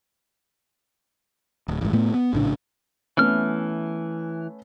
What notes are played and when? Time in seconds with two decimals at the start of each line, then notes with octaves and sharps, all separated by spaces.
1.68 D1
1.81 A1 G#2
1.93 A2 A3 B3
2.14 B3
2.33 A#1 A2 C#3 D4
3.17 E3 A3 B3 C#4 F6